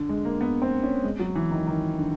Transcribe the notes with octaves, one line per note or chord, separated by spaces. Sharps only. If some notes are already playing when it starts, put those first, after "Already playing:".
Already playing: D3
G#3
A#3
B3
C4
C#4
G#3
F#3
E3
D#3
D#3
D3